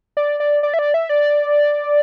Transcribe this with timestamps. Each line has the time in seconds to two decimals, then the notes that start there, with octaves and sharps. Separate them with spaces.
0.17 D5
0.40 D5
0.63 D5
0.74 E5
0.79 D5
0.94 E5
1.09 D5